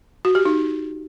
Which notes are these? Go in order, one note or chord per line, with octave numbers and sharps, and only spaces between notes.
F#4
G4
D#4